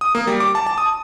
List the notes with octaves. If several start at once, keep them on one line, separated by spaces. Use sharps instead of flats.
D#6
A#3
G3
D6
A5
A5
D#6